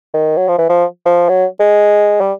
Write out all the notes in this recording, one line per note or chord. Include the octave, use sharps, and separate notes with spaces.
D#3
F#3
F3
E3
F3
F3
F#3
G#3
G3